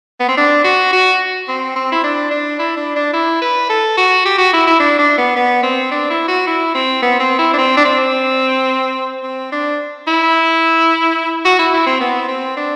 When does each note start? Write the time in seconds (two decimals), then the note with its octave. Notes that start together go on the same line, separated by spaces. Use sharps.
0.20 B3
0.28 C4
0.37 D4
0.64 F#4
0.93 F#4
1.48 C4
1.76 C4
1.92 E4
2.04 D4
2.31 D4
2.59 E4
2.76 D4
2.96 D4
3.13 E4
3.42 B4
3.69 A4
3.97 F#4
4.25 G4
4.38 F#4
4.53 E4
4.67 E4
4.80 D4
4.99 D4
5.18 B3
5.36 B3
5.63 C4
5.92 D4
6.10 E4
6.28 F#4
6.47 E4
6.75 C4
7.03 B3
7.20 C4
7.39 E4
7.53 D4
7.58 C4
7.77 D4
7.85 C4
9.23 C4
9.52 D4
10.07 E4
11.45 F#4
11.59 E4
11.74 E4
11.87 C4
12.01 B3
12.28 C4
12.57 D4